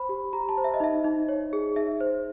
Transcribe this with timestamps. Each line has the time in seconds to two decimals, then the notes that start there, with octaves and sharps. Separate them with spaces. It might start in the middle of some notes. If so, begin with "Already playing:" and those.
Already playing: C5 B5
0.09 G4
0.33 G4 A#5
0.49 A5
0.58 C5
0.64 E5
0.74 D#5
0.80 D#4 E5
1.05 D#4
1.29 C#5
1.53 G#4
1.76 D#4 E5
2.00 C5